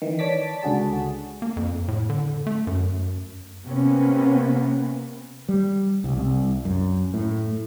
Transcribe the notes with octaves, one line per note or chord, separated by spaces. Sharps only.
D#3 E3
C#5 D5 A5 D6 B6
C#2 D3 F#4 G#4 A5
A#3
F2
A2
D3
A3
F#2
C3 A#3 B3 C#4
G3
C2
C2
F#2
A2